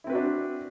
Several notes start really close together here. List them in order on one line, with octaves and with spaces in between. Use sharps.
E4 C4 B4 F#4 D4